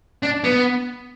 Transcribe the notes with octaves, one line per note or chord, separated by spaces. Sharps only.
D4
B3